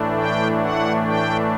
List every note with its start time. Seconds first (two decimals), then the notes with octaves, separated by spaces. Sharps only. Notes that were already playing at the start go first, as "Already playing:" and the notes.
Already playing: A2 E3 A3 D4
0.17 G5
0.62 F#5
1.06 G5